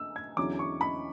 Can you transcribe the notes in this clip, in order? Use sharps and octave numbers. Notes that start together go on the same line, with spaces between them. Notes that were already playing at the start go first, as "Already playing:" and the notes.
Already playing: D3 A3 E6
G#6
E2 D3 F#3 C#4 E4 D6
C#6
B5